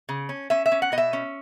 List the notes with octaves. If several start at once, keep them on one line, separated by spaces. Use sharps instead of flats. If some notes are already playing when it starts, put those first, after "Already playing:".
C#3
C#4
C#4 E5
E5
C#4
F#5
B2 D#5
E5
C#4